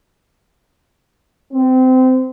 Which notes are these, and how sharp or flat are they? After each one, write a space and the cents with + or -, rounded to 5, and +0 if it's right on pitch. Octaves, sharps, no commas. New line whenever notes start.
C4 -25